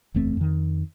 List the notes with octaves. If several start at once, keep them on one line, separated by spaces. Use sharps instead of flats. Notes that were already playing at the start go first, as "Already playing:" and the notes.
F#1 E2 A3 C4
F2 D#3